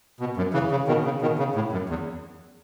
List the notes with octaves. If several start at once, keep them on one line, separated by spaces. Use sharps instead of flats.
B2
F#2
C#3 E3
C#3
B2 D#3
C#3
B2 D#3
C#3
A2
F#2
E2